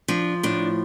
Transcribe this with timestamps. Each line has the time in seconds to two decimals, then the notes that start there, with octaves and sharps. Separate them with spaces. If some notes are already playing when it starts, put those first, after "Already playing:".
0.08 F3 D4
0.43 A2 D4